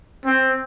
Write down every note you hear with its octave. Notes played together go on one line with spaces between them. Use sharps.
C4